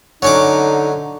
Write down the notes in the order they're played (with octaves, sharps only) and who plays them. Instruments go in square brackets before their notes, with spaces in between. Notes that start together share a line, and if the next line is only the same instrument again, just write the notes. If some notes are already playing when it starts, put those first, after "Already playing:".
[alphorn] D3 [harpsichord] F#3 C#4 D6 [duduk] D#4